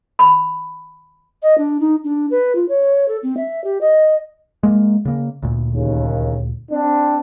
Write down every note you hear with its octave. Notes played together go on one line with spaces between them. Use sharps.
B5
D#5
D4
D#4
D4
B4
F4
C#5
A4
C4
E5
G4
D#5
G#3 A#3
C#3 A#3
D2 A#2
D#2 C#3
C4 D4